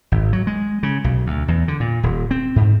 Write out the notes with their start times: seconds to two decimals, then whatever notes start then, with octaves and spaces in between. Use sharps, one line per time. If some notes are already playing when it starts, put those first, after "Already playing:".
0.12 G#1
0.33 F#3
0.47 G#3
0.83 C#3
1.04 B1
1.27 D2
1.48 E2
1.68 D3
1.80 A#2
2.03 D#1
2.31 C4
2.56 G#2